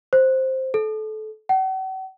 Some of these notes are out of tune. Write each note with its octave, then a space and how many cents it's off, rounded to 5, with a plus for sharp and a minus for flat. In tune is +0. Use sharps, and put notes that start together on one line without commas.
C5 +5
A4 -25
F#5 +45